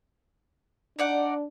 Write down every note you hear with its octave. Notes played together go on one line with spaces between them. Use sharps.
D4 D#4 D5 F#5